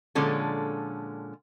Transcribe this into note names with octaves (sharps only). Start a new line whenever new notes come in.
A#2 D3 F3 G#3 C#4 A4